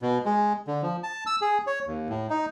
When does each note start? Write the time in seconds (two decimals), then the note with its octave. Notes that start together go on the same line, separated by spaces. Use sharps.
0.02 B2
0.25 G#3
0.67 D3
0.82 F3
1.03 A5
1.27 E6
1.42 G#4
1.67 C#5
1.87 D#2
2.09 A2
2.30 D#4